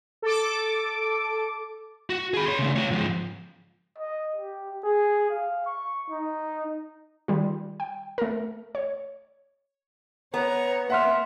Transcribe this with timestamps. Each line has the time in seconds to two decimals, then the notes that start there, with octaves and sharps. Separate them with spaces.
0.22 A4 D6
2.10 F#4
2.34 G#4 B5
2.46 C#5 C6
2.58 C#3 A3
2.76 F4 C#5
2.91 G#2 F3
3.98 D#5
4.36 G4
4.84 G#4
5.30 F5
5.66 C#6
6.10 D#4
7.28 D#3 G3 F4
7.80 G5
8.18 A3 A#4
8.75 C#5
10.34 B3 B4 C#5 A#5
10.90 A#3 E5 F#5 C6 F6